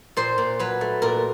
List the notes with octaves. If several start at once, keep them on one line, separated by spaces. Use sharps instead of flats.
A#2 C5
A#2
F#3 B4
A3
A#2 A#4